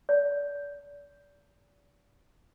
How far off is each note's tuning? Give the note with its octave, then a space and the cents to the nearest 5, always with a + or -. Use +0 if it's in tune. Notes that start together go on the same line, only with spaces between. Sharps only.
D5 -35